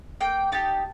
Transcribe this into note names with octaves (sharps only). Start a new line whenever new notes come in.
A#3 G5
D#4 G4 A5